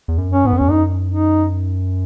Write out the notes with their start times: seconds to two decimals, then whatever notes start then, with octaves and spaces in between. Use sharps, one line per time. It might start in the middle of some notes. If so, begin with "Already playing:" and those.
0.08 E2
0.18 F#2
0.32 C#4
0.45 G#2 B3
0.53 F#2
0.58 E2 C#4
0.68 F#2 D#4
1.10 D#4